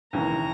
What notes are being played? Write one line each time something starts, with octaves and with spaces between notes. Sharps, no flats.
E1 D#2 C#3 E3 A#5